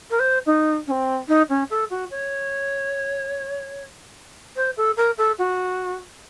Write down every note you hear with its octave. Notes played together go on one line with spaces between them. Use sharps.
A#4
C5
D#4
C#4
C4
D#4
C#4
A4
F#4
C#5
C5
A4
A#4
A4
F#4